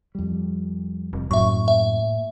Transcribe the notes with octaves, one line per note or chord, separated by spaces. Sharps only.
F2 G3
F1
F#2 A2 A#3 E5 C#6
E5